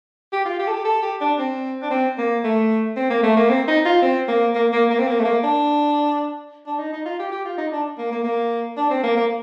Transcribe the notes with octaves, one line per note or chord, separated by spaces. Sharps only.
G4
F4
G4
A4
G4
A4
G4
D4
C4
D4
C4
A#3
A3
C4
A#3
A3
A#3
C4
D#4
F4
C4
A#3
A#3
A#3
A#3
C4
A#3
A3
A#3
D4
D4
D#4
D#4
F4
G4
G4
F4
D#4
D4
A#3
A#3
A#3
D4
C4
A#3
A#3